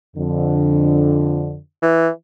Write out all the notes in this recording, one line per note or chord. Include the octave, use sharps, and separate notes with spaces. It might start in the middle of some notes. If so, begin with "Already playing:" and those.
F2 D3
E3